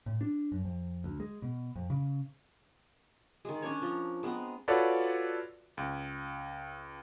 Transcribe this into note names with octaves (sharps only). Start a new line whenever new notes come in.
A2
D4
F#2
F2
D2
G#3
B2
F2
C#3
D#3 G#3
C#4 D4 C#5
F3 A#5
G#3 B3 C4 A#5
F4 F#4 A4 B4 C#5 D5
C#2